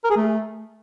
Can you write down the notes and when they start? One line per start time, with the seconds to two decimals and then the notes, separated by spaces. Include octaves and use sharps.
0.04 A#4
0.10 G#4
0.16 A3